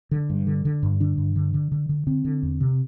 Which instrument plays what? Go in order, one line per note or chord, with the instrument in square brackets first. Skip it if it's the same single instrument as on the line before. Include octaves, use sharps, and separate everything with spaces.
[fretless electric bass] D3
G2
D3
D3
G2
D3 D4
G2
D3
D3
D3
D3
D3 C4
D3
E2
C3